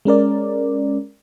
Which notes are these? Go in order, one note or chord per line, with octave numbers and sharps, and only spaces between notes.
G#3 C#4 A#4 D5